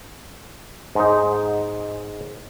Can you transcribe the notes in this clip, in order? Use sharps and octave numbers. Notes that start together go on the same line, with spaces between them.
G#2 D#4